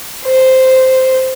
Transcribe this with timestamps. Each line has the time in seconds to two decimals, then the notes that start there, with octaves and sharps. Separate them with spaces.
0.25 C5